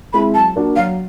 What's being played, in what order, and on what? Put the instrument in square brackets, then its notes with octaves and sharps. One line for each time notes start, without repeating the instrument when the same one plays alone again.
[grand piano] G#3 C4 E4 [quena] B5
[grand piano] F#3 [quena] A5
[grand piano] A#3 D4 F#4
[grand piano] F#3 [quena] F5